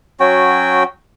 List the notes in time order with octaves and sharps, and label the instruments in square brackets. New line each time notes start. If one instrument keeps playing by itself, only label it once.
[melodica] F#3 C#4 F#4 G5